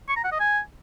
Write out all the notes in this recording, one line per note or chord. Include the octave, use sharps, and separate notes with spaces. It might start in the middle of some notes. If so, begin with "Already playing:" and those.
C#6
A#5
F#5
D#5
G#5